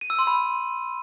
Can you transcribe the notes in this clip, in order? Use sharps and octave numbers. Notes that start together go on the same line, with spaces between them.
D#7
E6
C6
B5